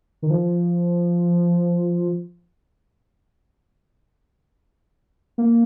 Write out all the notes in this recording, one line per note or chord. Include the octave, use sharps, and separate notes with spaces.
D#3
F3
A#3